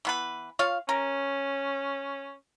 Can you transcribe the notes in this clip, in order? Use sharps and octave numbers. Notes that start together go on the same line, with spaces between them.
E3 B3 B4
F4 C#5 F5
C#4 A#4